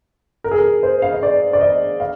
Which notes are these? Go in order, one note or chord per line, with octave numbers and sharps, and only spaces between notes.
A#4
G#4
A#4
C5
F5
D#5
D5
D5
D#5
F5